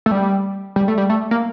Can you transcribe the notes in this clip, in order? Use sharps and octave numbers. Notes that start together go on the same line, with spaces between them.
A3
G3
G3
A3
G3
A3
A#3